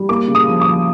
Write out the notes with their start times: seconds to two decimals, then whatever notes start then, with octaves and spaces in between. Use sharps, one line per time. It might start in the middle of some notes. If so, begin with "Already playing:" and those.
Already playing: G3
0.09 A#3 D6
0.28 C#3
0.35 D#6
0.48 F3
0.61 D6
0.68 F3